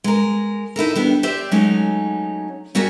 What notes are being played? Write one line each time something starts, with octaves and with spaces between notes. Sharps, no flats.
G#3 A#4
D#4 E4 A4 A#4
G3 B3 D4
G4 C5 D5 E5
F#3 G#3 A3 C#4 D#4
G3 C#4 F#4 G#4 A#4 E5